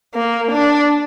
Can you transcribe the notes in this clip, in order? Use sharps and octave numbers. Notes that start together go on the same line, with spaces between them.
A#3
D4